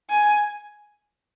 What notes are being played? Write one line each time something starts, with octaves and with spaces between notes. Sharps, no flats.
G#5